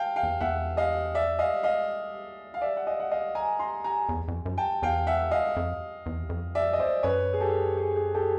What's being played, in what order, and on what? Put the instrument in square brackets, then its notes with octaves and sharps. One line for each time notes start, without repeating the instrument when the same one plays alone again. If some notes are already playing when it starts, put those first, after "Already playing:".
Already playing: [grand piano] F5 G5 A5
F5 G5
[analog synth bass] E2
[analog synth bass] E2 [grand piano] E5 F#5
[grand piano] D#5 F5
D5 E5
D#5 F5
D#5 F5
F5
D5 E5
F#5
D#5 F5
F#5
D#5 F5
G#5 A#5
A#5 C6
G#5 A#5
[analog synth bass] E2
F2
F#2
[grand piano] G5 A5
[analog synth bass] E2 [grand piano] F5 G5
[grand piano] E5 F#5
D#5 F5
[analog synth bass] F2
E2
F2
[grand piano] D5 E5
D#5
C5 D5
[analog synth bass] F#2 [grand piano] B4 C#5
[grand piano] G#4
G4 A4
G#4
G#4
G4 A4